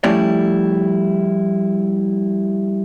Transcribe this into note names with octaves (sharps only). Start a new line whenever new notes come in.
F3 G3 A3 C#4 E4 D5